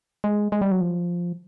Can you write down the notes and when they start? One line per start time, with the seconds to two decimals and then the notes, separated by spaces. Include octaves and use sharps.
0.24 G#3
0.52 G#3
0.61 G3
0.71 F#3
0.81 F3